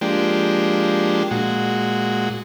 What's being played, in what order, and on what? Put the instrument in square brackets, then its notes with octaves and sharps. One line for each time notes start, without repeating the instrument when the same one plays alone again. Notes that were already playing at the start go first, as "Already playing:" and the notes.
[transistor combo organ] F3 G#3 A#3 D4 G4
A#2 G#3 F#4